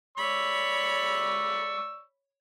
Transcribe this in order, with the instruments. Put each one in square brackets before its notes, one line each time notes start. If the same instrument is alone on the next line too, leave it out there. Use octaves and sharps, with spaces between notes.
[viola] C#5 B5 [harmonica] D5 C#6 E6